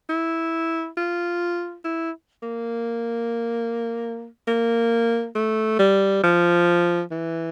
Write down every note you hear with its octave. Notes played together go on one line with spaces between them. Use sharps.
E4
F4
E4
A#3
A#3
A3
G3
F3
E3